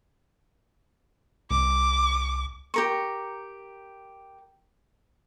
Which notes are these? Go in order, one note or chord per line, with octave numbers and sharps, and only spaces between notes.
C2 D6
G4 A#4 C#6